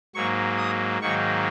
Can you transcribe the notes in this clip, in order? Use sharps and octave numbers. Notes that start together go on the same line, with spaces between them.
G#2 F#3 A#3 C#6
D#6
G#2 D#3 F#3 A#3 C#6